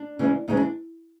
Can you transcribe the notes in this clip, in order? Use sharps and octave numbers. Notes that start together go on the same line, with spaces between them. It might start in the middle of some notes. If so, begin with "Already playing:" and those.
Already playing: D4
D2 C#3 E3 G#3
D2 C#3 E3 G#3 D#4
D4